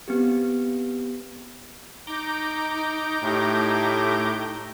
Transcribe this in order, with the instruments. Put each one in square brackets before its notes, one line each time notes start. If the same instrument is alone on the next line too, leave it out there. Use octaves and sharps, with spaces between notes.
[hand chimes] B3 C4 G4
[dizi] D#4 [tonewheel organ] A#5 D6 G6
[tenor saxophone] A2 [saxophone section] A3 G4